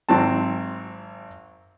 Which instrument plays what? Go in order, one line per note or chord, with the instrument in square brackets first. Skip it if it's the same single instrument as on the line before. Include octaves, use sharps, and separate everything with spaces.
[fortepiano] G#1 F#3 C4 A5